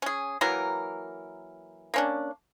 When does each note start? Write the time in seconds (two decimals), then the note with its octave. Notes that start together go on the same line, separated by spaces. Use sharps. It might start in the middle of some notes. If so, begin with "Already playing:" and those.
0.02 C#4 G#4
0.41 E3 F#3 A#3 A#4
1.94 A#3 C#4 D4